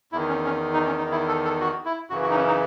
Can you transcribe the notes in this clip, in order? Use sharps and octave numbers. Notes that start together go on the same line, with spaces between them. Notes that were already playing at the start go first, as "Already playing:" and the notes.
E2 D#3 E4
C#4
C#4
D#4
C#4
D#4
E4
A4
A4
F#4
E4
F#2 C#3 E3 F#4
F#4
D#4
C#4
D#4